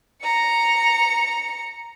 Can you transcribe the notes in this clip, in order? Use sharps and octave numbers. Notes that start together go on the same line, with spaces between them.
A#5 C#7